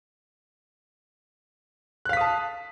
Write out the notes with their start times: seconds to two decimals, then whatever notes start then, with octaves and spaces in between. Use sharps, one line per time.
2.05 F#6
2.09 F5
2.13 B6
2.17 D#6
2.21 A5